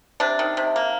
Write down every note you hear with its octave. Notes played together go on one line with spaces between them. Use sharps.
C3 D4
D#3
C3
A#3